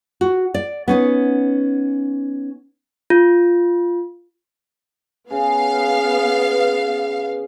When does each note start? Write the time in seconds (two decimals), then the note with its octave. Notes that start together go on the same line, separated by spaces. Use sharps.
0.21 F#4
0.54 D5
0.88 B3 C#4 D#4
3.10 F4
5.30 C#3 B3 F5